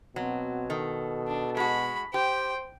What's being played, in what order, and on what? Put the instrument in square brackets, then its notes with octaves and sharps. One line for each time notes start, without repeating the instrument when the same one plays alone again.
[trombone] B2 [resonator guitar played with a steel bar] F#3 [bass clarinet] C4
[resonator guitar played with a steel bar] D#3 [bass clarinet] A4
[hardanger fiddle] D4
[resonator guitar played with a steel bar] G#3 F#4 [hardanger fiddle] B5
[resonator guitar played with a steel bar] G4 [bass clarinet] C5 [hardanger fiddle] G5